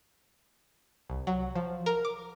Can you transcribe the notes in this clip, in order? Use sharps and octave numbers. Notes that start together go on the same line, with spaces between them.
C2
F#3
F3
A#4
D6